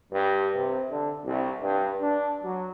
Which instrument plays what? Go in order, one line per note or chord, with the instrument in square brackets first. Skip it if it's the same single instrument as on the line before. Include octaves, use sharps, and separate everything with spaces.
[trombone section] G2
C3
D3
C2
G2
D4
F#3